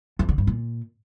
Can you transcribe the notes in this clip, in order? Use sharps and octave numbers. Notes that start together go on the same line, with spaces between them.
F2
D3
G2
A#2